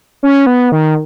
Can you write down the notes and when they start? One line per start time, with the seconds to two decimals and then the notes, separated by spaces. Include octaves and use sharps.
0.23 C#4
0.46 B3
0.72 D#3